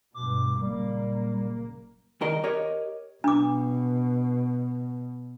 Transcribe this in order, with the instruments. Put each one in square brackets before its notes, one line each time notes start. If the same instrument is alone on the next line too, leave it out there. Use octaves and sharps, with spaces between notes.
[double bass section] G2 B2 [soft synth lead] D6
[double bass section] F#1 A#2 A#3 [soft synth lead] G3
[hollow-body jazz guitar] C2 D#3 A#4 D#5
G4 A#4 C#5 D#5
[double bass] B2 [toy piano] D4 D6